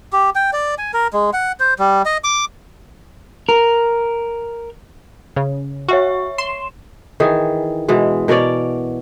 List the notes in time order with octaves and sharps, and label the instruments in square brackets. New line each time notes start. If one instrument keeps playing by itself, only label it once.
[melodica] G4
G5
D5
G#5
A#4
G#3
F#5
C5
G3
D#5
D6
[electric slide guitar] A#4
[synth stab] C#3
[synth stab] F#4 [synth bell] C#5 E5 C#6
[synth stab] C6 [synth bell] E7
[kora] D#3 E3 G#4
B2 E3 G#3
B2 A#4 C#5 D5